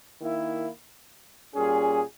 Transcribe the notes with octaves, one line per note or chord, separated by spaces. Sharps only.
D#3 A#3 E4
A#2 G3 C#4 G#4